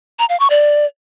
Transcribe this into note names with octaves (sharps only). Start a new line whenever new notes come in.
A#5
F5
C#6
D5